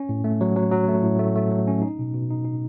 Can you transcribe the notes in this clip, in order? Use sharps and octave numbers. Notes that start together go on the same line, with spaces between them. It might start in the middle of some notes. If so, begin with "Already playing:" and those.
Already playing: C#4
A2
A3
F#3
F#3
F#3
A3
A2
A3
A3
F#3
C#4
D#4
B2
B2
D#4
D#4